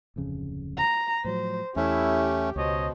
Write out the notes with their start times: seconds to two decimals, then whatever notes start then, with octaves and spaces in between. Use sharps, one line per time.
0.16 D1 F2 C#3
0.78 A#5
1.24 A2 F3 F#3 C5
1.76 E2 A3 C#4 E4 G4
2.56 C#2 B2 C5 C#5 D#5